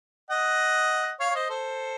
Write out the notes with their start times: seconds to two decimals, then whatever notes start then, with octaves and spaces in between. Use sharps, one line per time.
0.30 D#5 F#5
1.20 C#5 F5
1.30 C#5
1.35 C5 D#5
1.50 A4 C5